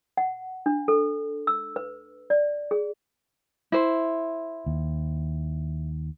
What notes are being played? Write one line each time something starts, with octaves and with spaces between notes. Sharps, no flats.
F#5
D4
A4
E6
B4
D5
G#4
E4 C5
D#2